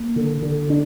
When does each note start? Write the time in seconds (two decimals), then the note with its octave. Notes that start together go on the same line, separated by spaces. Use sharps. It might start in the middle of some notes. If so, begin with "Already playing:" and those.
Already playing: A#3
0.16 D3
0.42 D3
0.70 D4